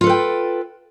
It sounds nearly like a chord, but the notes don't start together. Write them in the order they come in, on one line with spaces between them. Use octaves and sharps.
F4 A4 B4 G5